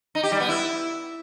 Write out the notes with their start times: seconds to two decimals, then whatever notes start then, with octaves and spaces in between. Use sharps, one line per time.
0.15 D#4
0.23 G4
0.32 G3
0.40 B3
0.49 E4